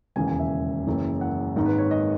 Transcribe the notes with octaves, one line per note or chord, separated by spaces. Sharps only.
E1 D#2 C#3 E3 G#5
G#5
E5
F#1 F#2 E3
F#5
G#1 G#2 D#3
B4
C#5
D#5